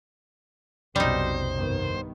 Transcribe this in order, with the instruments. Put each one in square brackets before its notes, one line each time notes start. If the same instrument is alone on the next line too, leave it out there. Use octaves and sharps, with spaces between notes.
[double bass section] B1 [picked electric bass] F2 C3 C#4 [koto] G3 D#4 [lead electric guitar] C5
[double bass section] G2 D#3 B3